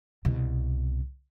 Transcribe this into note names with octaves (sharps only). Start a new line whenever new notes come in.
C2 B2